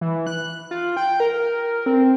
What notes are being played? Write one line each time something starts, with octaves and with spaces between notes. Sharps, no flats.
E3
F#6
F4
G5
A#4
C4